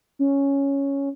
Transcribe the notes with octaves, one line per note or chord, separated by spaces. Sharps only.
C#4